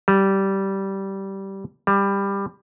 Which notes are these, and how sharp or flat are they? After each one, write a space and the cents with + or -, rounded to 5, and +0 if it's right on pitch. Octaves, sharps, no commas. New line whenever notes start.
G3 -15
G3 +15